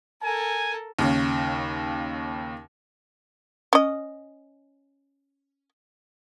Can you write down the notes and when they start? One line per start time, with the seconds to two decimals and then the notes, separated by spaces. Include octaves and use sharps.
0.23 A4 A#4 G#5
0.99 D#2 C#3
3.73 C#4 D#5